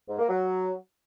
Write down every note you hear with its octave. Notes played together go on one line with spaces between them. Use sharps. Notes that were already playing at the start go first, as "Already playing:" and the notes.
G#2
A#3
F#3